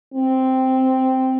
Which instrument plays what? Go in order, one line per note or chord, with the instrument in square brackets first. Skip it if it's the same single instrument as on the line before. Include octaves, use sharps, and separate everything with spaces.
[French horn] C4